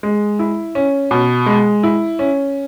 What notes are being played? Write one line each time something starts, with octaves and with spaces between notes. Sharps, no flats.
G#3
E4
C#4
B2
G#3
E4
C#4